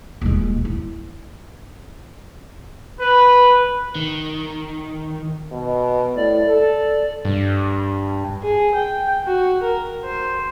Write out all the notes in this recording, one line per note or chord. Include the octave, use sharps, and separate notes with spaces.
D#1 G#3
E4
B4
D#3
B2
A2 D5
A4
G2
G#4
G5
F#4
A#4
C5